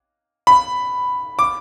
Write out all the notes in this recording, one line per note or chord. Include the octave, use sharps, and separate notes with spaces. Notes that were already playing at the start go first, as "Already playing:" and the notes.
B5
D6